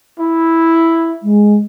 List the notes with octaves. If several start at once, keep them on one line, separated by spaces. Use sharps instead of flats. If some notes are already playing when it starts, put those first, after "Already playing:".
E4
G#3